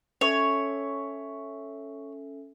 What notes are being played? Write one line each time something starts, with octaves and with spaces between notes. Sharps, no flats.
C#4 A4 C#5 E5